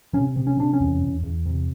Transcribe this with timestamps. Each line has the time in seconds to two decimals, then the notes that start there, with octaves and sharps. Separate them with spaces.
0.13 C3 C#4
0.36 C3
0.47 C#4
0.57 C3 D4
0.73 C#4
0.80 E2
1.01 E2
1.23 E2
1.46 C3